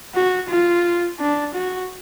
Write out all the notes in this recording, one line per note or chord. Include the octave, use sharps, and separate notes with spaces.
F#4
F4
D4
F#4